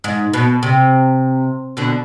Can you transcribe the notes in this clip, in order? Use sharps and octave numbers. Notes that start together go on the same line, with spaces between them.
G#2
B2
C3
B2 D3